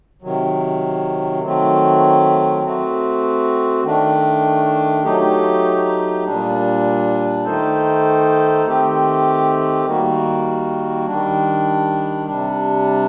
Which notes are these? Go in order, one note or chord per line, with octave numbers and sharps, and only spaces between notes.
C3 D#3 F#3
D#3 F#3 A3 C4
A3 C4 F#4
D#3 A3 D4
F#3 A3 D#4 G4
A#2 G3 D4
D#3 A3 D#4 A4 C5
D#3 A3 C4 G4
D#3 G3 A#3 F#4
D#3 G3 D4
C3 G3 D4